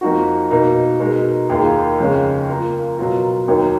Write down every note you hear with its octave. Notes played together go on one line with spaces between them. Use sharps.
F2 F3 A#3 D#4 F#4
B2 A#3 D#4 A#4
B2 G#3 D#4 A#4
D#2 D#3 A#3 F4 G#4
F2 C#3 G#3 C#4
F3 A#3 F4 A#4
B2 F#3 B3 F4 A#4
D#2 D#3 F#3